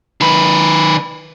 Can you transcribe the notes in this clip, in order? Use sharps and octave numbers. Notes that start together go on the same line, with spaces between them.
D#3 B4